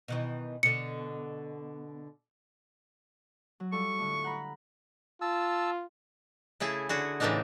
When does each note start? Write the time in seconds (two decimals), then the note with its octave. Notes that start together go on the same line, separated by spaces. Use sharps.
0.08 B2 D#3 E3
0.63 B2 D3 C#7
3.60 F#3
3.72 G3 F4 A4 C#6
3.98 A2 D3
4.24 F#5 A#5 B5
5.21 F4 A5 E6
6.60 C#3 A3 E4 G#4
6.89 D3 F#4 G#4
7.20 A2 C#3 E3 A3 D4 D#4